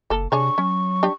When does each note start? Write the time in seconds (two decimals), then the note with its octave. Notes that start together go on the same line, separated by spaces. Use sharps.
0.10 F#1 A#3 A4
0.32 C3 D4 G#4 C#5 C#6
0.58 F#3 C#4
1.03 D4 G4